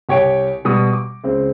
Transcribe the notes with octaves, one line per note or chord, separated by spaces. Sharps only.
C2 G4 C#5 G5 D7
B2 G3 D#6
D6
C#2 C4